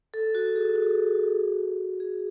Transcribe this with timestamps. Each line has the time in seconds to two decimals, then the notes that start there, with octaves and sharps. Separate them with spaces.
0.14 A4
0.35 F#4
0.56 G#4
0.76 F#4
2.00 G#4